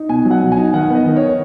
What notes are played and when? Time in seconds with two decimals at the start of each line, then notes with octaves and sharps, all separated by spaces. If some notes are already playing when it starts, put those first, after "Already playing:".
Already playing: D#4
0.09 B2 G#5
0.25 F#3
0.31 F#5
0.41 B2
0.52 G#5
0.57 D#4
0.73 D#3 F#5
0.89 B3
0.95 D#5
1.06 D#3
1.16 C#5
1.22 D#4